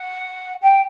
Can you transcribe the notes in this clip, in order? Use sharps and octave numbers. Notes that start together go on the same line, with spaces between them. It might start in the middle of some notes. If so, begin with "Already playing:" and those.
Already playing: F#5
G5